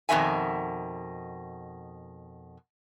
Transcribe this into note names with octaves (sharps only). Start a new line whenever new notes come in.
F2 B2 D#3 E5 G#5